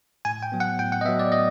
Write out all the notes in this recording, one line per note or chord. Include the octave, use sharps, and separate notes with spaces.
A2 G#5
G5
F#3 B3
F#5
A2 G5
F#5
D#5
F#3 B3 E5
D5
A2 D#5